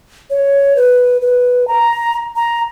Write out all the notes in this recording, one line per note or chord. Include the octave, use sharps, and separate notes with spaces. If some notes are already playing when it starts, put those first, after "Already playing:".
C#5
B4
B4
A#5
A#5